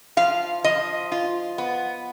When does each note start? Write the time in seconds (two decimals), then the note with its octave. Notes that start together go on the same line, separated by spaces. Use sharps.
0.17 F3 F5
0.64 F3 D#5
1.12 F4
1.58 B3